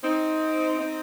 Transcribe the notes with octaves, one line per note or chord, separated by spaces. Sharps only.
C4 D#4
C4 D#4